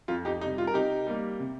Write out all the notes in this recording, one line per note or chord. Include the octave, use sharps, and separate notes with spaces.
F2 F4
D#4 G4
C3 G3 D#4
F4
A#4
C3 D#4 G4
G3 A#3
C3